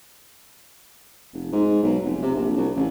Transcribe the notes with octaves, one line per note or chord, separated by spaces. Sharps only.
F1
G#2
B1
F1
C3
A#1
C2
A1